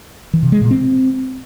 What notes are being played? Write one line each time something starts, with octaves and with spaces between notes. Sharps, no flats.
E3
C3
G#3
A#2
C4